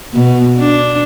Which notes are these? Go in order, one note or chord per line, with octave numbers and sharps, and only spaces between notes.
B2
D4